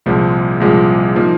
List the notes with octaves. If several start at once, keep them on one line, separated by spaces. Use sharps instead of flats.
C2 A#2 F3 G#3
C2 A#2 F3 G#3
F3 A#3 D#4